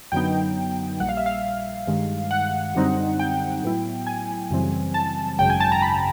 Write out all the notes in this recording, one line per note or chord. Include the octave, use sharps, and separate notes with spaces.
F#2 D3 F#3 B3 D#4 G5
A#1 A#2 G3 F#5
F5
E5
F5
G2 D#3 G#3
F#5
F#2 D3 G3 C4 D#4
G5
A2 F#3 B3 E4
G#5
F#2 C#3 E3 G3 C4
A5
G#1 F#2 C#3 G5
G#5
A5
A#5
B5